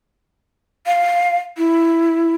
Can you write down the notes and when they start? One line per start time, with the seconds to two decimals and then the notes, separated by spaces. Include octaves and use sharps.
0.87 F5
1.57 E4